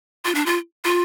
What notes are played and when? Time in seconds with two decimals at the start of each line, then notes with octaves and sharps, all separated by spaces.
0.25 F4
0.35 D4
0.46 F4
0.84 F4